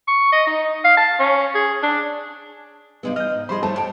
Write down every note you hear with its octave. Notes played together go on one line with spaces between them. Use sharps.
C#6
D#5
D#4
F5
A5
C#4
G#4
D4
G2 C#3 G3 G#3 B3 A4
E3 D#5 F6 G6
G#2
F3 G3 G#4 C5 D#5 B5 C6
G3 A3 C5 C#5 A5
A2 G5